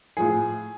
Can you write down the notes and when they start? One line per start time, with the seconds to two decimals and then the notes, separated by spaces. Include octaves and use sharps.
0.17 A2 F3 G#4